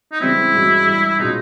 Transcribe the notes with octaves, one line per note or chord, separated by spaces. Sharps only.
D#4
C#3 E3 G3 C4 E4
G2 E3 G#3 C#4 F#4
G2 E3 G3
B2 G#3 C#4 D#4 F4